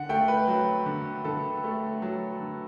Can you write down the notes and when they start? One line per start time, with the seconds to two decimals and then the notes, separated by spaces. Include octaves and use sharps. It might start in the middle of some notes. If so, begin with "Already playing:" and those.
Already playing: D3 F#5
0.09 A3 G5
0.28 B4
0.48 F#3
0.86 D3
1.24 D3 A4
1.64 A3
2.02 F#3
2.40 D3